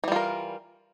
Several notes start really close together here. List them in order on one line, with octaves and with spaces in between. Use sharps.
E3 G3 F4 A#4